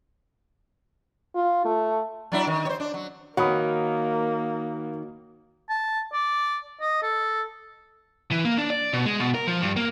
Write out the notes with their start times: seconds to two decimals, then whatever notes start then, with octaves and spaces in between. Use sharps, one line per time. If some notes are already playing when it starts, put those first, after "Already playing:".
1.35 F4
1.65 A3
2.32 F#3 D4 E4
2.47 D#3
2.65 C5 C#5
2.80 D4
2.94 F#3
3.37 D#3 A#3 F#4 C#5 F#5 B5 D#6
5.69 A5
6.13 D5
6.81 D#5
7.02 A4
8.31 E3
8.45 A#3
8.58 D4
8.70 D5
8.93 B2
9.06 G#3
9.20 B2
9.35 A#4
9.47 F3
9.62 G2
9.76 A#3